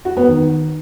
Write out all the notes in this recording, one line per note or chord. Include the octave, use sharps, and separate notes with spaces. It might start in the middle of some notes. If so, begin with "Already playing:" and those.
F#4
B3
D#3